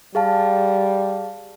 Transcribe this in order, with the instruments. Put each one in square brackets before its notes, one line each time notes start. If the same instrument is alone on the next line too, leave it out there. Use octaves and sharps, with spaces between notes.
[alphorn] G3 [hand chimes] G#4 F5 A5